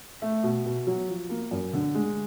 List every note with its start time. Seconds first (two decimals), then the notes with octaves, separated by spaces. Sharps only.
0.22 A3
0.43 B2
0.65 B2
0.87 F#3
1.08 F3
1.30 A#3
1.51 F#2
1.73 D3
1.95 G#3